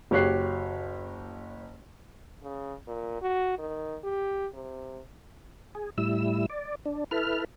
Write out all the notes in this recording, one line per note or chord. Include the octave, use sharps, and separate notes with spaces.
F#1 F#4 G4 C#5 F#6 C7
C#3
A#2
F#4
D#3
G4
C3
G#4
A2 G3 E4 E6
D5
D4
E4 A4 B4 F6